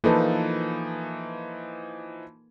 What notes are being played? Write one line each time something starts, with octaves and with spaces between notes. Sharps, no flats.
E3 F3 A#3 D#4 A4 B4